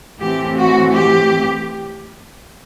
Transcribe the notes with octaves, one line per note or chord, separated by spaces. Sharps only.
A2 E3 A3 C4 G4
F#4
G4